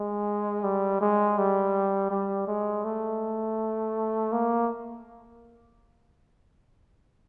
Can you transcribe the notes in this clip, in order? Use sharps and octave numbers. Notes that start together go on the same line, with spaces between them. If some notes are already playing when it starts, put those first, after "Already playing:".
Already playing: G#3
G3
G#3
G3
G3
G#3
A3
A#3